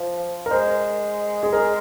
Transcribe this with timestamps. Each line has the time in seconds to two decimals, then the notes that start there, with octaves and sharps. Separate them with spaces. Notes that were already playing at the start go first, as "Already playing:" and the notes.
Already playing: F3
0.46 A#4
0.51 G#3 C5
1.43 G#4
1.53 A#4